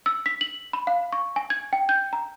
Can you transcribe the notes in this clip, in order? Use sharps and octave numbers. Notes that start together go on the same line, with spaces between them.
E6
B6
F#7
B5
F5
C#6
G#5
G#6
G5
G6
A#5